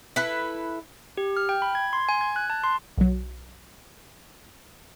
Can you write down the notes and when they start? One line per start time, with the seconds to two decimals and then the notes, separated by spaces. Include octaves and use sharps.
0.16 E4 A4 B4
1.17 G4
1.37 F6
1.49 G5
1.62 B5
1.75 G#6
1.93 C6
2.09 G#5
2.21 G#6
2.36 F#6
2.50 A5
2.64 C6
2.98 B1 F#3